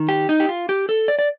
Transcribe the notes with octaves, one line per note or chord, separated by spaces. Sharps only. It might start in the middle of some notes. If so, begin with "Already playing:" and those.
Already playing: D#3
G4
D#4
G4
F4
G4
A4
D5
D5